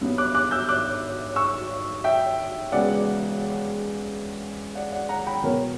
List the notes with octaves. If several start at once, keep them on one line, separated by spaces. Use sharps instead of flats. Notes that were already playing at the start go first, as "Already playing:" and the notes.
G2 F#3 B3
D6 F#6
D6 F#6
E6 G6
D6 F#6
C#6 E6
E5 G5
E1 E2 C#3 D5 F#5
D5 F#5
D5 F#5
F#5 A#5
G5 B5
E2 B2 F#3 A#4 C#5